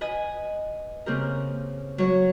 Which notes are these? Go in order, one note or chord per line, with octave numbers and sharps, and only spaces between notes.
B4 D#5 G#5
C#3 A#3 C4 G4 A#4
F#3 C#5